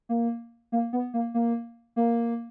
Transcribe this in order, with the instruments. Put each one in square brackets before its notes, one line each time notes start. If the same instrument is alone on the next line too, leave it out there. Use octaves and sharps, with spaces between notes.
[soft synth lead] A#3
A#3
B3
A#3
A#3
A#3